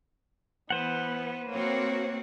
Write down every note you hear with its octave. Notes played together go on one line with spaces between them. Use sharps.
E3 B3 B4 C5 F#5
A#3 C4 F#4 C#5